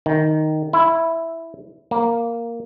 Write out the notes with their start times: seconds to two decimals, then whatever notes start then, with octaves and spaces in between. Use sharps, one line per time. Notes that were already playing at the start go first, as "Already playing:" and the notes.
0.06 D#3
0.73 E4
1.91 A#3